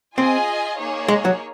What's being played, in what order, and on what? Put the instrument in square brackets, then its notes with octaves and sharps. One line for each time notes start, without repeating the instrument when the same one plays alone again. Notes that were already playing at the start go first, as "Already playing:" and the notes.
[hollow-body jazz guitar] C4 [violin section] F4 G#4 D#5 G#5
[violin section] A#3 D#4 G#4 C#5
[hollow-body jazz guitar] G#3
F#3